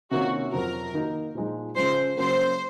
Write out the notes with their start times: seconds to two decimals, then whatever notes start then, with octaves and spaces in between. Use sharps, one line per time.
0.11 C3 D#3 A#3 C#4 F4 F#4
0.52 F2 C3 F#3 C4 F#4 A#4
0.94 D#3 A#3 D#4 F#4
1.35 A#2 F3 G#3 D#4
1.76 C#3 F3 G#3 C5
2.17 C#3 F#3 A#3 C5